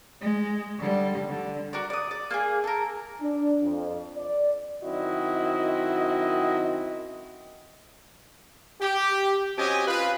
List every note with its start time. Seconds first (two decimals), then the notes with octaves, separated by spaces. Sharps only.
0.21 G#3
0.79 D3 G3
1.28 D3
1.73 F#4 A#4 D5
1.90 D5 D#6
2.11 D5
2.31 A#3 F4 G#4
2.64 A4 A#4
3.21 D4
3.62 F2
4.16 D5
4.83 F#2 D#3 C4 E4 F#4 D#5
8.81 G4
9.58 F#3 C4 C#4 G4 D#5 G#5
9.87 F4 B4